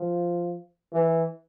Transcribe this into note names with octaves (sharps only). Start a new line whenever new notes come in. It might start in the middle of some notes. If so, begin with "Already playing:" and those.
Already playing: F3
E3